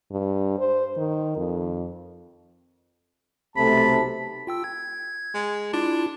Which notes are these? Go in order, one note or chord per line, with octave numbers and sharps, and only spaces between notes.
G2
C5
D#3
F2
B1 C3 A3 A5 B5
F4 G5 E6
G#6
G#3
D4 E4 F4